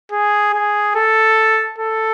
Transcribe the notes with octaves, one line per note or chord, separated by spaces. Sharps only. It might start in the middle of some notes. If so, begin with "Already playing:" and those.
G#4
G#4
A4
A4